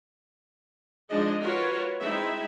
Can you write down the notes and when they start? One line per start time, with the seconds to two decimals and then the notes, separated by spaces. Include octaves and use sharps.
1.09 F3 G#3 D4 D#4 G#4 D#5
1.41 F4 F#4 A#4 B4 C#5
2.00 G#3 C4 D#4 E4 E5